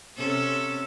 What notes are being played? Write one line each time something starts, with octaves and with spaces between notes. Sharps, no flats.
C3 C#4 A4